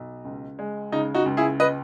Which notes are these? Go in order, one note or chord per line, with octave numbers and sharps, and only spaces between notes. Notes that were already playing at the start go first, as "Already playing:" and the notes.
Already playing: B1
C#2
G#3
C#3 D#4
D#4 F#4
C#2
E4 G#4
B4 D#5